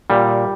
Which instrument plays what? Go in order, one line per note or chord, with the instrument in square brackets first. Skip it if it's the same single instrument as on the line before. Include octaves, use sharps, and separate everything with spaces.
[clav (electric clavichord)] A#2 G3